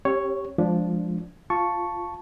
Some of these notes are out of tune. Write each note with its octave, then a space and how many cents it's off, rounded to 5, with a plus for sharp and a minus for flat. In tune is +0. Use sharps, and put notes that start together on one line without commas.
C#4 -45 G4 +0 C#5 +0
F3 +0 G#3 +0 D4 -5
F4 +0 A5 +0 C#6 +0